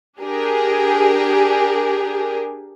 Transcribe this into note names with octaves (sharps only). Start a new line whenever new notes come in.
D4 G4 G#4 A#4